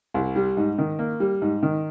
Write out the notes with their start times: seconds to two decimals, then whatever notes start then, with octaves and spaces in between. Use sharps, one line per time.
0.14 C2
0.36 G3
0.57 G#2
0.78 D#3
0.99 A#3
1.20 G3
1.42 G#2
1.63 D#3